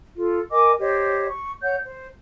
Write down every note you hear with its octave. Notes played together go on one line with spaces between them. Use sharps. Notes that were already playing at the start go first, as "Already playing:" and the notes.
F4 A4
A#4 D#5 G#5 D6
G4 C5 C#5 D#5
C#6
C#5 F#5 G6
C5